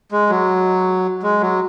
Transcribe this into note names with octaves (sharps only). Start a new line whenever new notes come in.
G#3
F#3
G#3
F#3